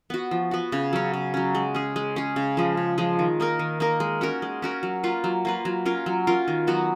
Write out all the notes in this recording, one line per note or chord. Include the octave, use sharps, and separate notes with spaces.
B3 F#4
F3
B3 F#4
C#3
F#3 C#4
C#3
F#3 C#4
G#3
C#4 G#4
G#3
C#4 G#4
C#3
F3 G#3
C#3
F3 G#3
D#3
A#3 D#4 A#4
D#3
A#3 D#4 A#4
G#3
C#4 F#4 A#4
G#3
C#4 F#4 A#4
F#3
A#3 F4 B4
F#3
A#3 F4 B4
F#3
C#4 F4 A#4
F#3
C#4 F4 A#4
D#3
F#3 B3 F#4